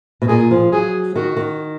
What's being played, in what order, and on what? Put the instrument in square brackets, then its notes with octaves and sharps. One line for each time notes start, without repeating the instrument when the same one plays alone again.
[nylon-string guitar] B2
[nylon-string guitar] A#2 [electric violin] G#4
[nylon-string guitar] F3
[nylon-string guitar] F#3 [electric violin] G#4
[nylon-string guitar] D#3 [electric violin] F#4
[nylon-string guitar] D#3